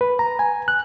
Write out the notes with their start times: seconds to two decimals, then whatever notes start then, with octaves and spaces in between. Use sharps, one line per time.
0.01 B4
0.19 A#5
0.39 G#5
0.68 F#6